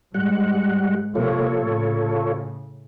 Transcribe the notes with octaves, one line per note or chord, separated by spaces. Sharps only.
G#2 G3 G#3 F#5
C3 F3 A#3 F4 A4 C#5
A2 C#3